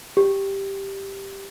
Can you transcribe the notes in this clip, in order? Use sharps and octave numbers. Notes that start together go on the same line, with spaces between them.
G4